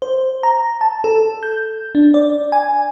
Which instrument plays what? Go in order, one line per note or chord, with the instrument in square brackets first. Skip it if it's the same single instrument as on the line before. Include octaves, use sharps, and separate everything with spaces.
[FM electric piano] C5
A#5
A5
A4
G6
D4
D5
G#5